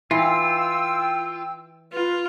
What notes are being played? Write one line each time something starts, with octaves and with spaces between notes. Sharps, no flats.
E3 F4 G5 E6
F4 B4